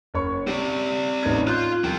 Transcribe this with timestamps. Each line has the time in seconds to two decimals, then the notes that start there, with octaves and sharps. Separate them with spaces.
0.14 F#1 C#5 C#6
0.47 C4 G4 D5
1.23 A1 D#4 G#6
1.47 F4 F#6 G6
1.84 C2 F3 G5